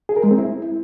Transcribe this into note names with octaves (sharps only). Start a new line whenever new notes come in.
G#4
A#4
G#3
C4
E4